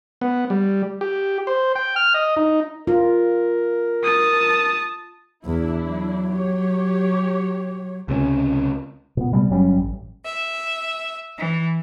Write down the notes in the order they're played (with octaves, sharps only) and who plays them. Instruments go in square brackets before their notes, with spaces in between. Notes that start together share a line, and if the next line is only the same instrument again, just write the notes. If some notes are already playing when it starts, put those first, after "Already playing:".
[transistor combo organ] B3
G3
G4
C5
G5
F6
D#5
D#4
[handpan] F4 [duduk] A#4
[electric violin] A5 D#6
[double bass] E2 [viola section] D4 E4
[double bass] F#3
[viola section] G4 C#5
[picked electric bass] C#2 C3 C4 C#4
[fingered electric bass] A#2 B3
C3 G3 A3 B3
G1 F#3 G3 C#4
A1
[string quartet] E5
E3